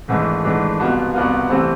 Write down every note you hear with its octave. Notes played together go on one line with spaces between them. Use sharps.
G#1 G#2 E3 A3 D4
G#1 G#2 E3 A3 D4
C2 B2 B3 F4
C2 B2 B3 F4
C3 E3 A3 C4